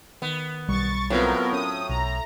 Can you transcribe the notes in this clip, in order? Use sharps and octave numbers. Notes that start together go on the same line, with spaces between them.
D#3 B3
B1 G3 C#6 A6
A2 F#3 B3 C4 F4 A#4
C#4 D#6
B1 A#5